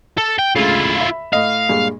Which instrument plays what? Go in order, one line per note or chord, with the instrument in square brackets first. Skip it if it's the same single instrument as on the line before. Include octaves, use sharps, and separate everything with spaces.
[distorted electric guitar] A4
G5
[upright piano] D2 G#2 C#3 [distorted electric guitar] E4 F4
[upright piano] E5 B5
[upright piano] A2 D#5 [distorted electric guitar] F5
[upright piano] G2 A#2 G#3